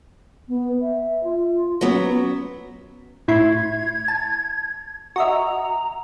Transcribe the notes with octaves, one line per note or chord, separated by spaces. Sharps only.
B3
E5
F4
F#3 B3 C#4
A2 E4 C6 G#6
A5
F#4 D#5 E5 A#5